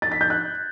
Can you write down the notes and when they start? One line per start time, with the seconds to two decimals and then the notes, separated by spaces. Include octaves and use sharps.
0.02 A6
0.12 B6
0.21 G6
0.30 F#6